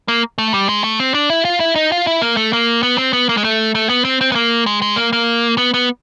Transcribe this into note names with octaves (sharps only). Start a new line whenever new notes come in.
A#3
A3
G3
G#3
A3
C4
D4
E4
F4
E4
D#4
F4
E4
A#3
A3
A#3
B3
C4
B3
A#3
G#3
A3
A3
B3
C4
C4
B3
A#3
G#3
G#3
A#3
A#3
B3
B3